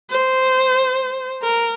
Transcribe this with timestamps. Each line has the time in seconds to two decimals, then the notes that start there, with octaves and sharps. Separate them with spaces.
0.10 C5
1.43 A#4